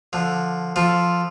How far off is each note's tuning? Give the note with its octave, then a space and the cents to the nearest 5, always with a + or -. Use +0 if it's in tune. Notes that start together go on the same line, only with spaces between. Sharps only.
D3 +0 F3 +0
F3 +0 F4 +0 A4 +0